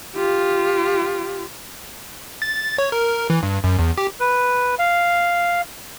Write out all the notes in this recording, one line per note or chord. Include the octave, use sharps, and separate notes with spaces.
F4 G4
A6
C#5
A#4
E3
G2
F#2
E2
G4
B4
F5